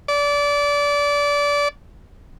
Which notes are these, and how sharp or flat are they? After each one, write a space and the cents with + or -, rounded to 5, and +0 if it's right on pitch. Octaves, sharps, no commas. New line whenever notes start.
D5 -25